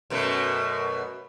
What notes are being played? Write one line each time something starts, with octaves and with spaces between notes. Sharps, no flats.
F#2 B2 A3